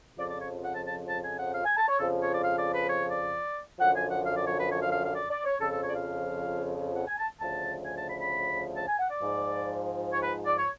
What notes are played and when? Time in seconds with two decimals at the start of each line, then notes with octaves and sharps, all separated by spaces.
0.18 F2 C#3 F3 D5
0.29 D5
0.41 C#5
0.64 F#5
0.75 A5
0.86 A5
1.09 A5
1.24 G#5
1.38 F#5
1.54 F5
1.65 G#5
1.76 A5
1.88 C#5
1.98 F2 C#3 F3 A4
2.21 C#5
2.33 D5
2.44 F5
2.59 D5
2.74 B4
2.89 C#5
3.11 D5
3.79 F#2 D3 F3 F#5
3.95 G#5
4.10 F#5
4.25 F5
4.36 D5
4.47 C#5
4.59 B4
4.70 C#5
4.81 F5
4.92 F5
5.04 F5
5.14 D5
5.30 D5
5.45 C#5
5.60 F2 C#3 F3 A4
5.71 A4
5.82 C#5
5.89 D5
5.94 F5
6.95 F#5
7.07 G#5
7.18 A5
7.41 D2 C#3 F3 A5
7.85 G#5
7.97 A5
8.08 B5
8.20 B5
8.76 A5
8.88 G#5
8.99 F#5
9.10 D5
9.21 G#2 F3
10.12 C#5
10.23 B4
10.46 D5
10.57 C#5